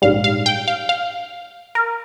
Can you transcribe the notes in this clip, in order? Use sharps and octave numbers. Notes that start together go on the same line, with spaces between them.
A#1 G#2 G3 F5
F5
G5
F5
F5
A#4